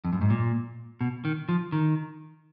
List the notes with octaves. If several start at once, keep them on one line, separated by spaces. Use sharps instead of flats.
F2
F#2
G#2
A#2
B2
D#3
F3
D#3